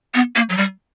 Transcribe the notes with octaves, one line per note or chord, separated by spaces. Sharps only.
B3
A#3
F#3
G3